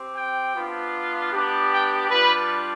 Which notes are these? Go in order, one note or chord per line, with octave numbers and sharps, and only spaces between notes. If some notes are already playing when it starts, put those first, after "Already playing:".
Already playing: C4 G4
G5
B3 D4 F4
B3 D4 G4
G5
G3 D4 F4 B4